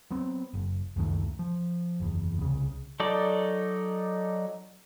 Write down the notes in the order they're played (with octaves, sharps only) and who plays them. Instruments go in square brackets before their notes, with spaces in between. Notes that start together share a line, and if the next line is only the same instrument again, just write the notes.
[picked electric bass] F#3 B3 C4
F#1
C#2 F#2 D#3 A3
F3
F#1 E2
C2 C#3
[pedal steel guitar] F#3 D#4 A4 D5